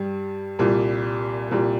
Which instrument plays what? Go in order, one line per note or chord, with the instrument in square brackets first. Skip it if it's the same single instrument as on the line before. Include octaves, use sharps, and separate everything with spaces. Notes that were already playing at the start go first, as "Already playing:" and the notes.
Already playing: [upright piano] G2 G3
C2 A#2 G3
C2 A#2 G3